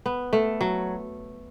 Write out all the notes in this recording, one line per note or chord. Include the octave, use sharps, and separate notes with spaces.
B3
A3
F#3